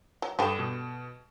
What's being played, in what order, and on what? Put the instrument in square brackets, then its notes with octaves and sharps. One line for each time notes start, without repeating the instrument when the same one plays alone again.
[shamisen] F#3
[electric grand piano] G2 D#6 E7 [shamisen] D3 G3 G5
[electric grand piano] B2